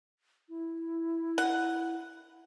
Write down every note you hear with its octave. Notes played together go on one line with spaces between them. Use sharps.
E4
F#5